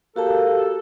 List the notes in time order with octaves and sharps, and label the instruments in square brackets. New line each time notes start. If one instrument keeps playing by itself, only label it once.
[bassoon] A#3 [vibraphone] F#4 G4 A5 [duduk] A4